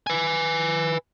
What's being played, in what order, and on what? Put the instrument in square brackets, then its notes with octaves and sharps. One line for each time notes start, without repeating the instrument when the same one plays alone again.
[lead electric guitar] B4 G#5